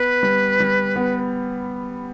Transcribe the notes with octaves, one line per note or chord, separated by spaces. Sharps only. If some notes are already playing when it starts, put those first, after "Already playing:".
Already playing: B3 B4
G3
G3
B3